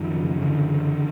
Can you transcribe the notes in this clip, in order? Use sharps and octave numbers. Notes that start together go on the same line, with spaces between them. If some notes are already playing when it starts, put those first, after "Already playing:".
Already playing: F#2 D#3 F3
C#3
F#2 D3 E3
C#3